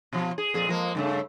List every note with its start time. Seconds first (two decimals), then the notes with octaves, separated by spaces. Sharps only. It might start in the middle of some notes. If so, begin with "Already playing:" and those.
0.13 B2 F3
0.38 G#4
0.54 F2 A#2 G#4
0.68 F3 G#3 A#3
0.95 G2 C#3 A3